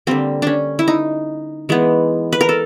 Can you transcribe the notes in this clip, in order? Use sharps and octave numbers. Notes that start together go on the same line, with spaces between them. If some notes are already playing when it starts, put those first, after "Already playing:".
D3 G3 A#3 C4
C#4 D4
E4
D#4
E3 G#3 B3
B4
A#4
A4